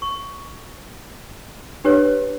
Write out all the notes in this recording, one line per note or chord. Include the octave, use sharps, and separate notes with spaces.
C#6
D4 G4 B4 C#5